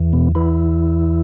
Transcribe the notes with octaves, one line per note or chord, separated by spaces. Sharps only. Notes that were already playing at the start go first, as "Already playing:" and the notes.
Already playing: E2 E3
B2 B3
E3 E4